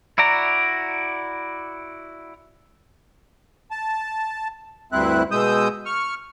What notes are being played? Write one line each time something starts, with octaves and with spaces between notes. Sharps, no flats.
E4 F#4 D5 A#5
A5
D2 G2 C4 E4 F#6
B2 G#3 D#6 E6 G6
C#6 F6